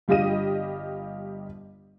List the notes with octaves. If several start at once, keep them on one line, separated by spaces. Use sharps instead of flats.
G1 G3 F4 G4 D#5 D#7